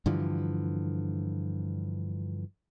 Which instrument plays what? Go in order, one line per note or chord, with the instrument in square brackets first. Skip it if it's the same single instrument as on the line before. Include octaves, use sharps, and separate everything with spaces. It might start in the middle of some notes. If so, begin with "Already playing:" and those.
[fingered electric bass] G2 D3 E3 F3